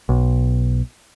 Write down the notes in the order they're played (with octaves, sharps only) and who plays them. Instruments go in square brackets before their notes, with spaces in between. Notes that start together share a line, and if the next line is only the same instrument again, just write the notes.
[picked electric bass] B1